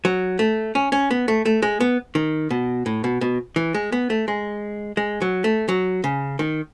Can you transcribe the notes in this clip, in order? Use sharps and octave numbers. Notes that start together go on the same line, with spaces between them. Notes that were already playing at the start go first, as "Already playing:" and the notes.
F#3
A3
C#4
C#4
B3
A3
A3
G#3
B3
D#3
B2
A2
B2
B2
E3
G#3
B3
A3
G#3
G#3
F#3
A3
F#3
C#3
D#3